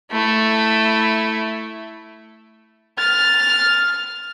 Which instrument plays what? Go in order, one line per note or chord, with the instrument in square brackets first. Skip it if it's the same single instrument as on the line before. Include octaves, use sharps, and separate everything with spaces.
[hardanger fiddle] A3 E4
[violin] F6 A6